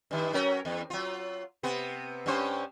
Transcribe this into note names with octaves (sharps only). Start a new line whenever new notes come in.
G2 D#3
F#3 C#4 A#4
E2
F#3 F4
C3 B3
G2 C#4 C5